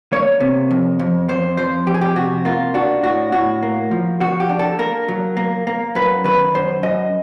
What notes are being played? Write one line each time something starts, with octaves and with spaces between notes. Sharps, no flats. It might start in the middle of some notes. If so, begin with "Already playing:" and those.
A#3 C#5
C3
F2
F2
F2 C5
F3 C5
F2 G4
G#4
G4
C3 F#4
A#3 F4
D4 F#4
A2 F#4
A2 F#4
A#3
F3
F3 F#4
G4
D4
A4
A#3 A#4
F#3
A#3
A#3
F#2 B4
D#3 B4
F#2 C5
F#2 D#5